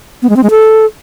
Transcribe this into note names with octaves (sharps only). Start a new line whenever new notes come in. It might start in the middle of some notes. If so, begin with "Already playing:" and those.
B3
G#3
C4
G#3
A4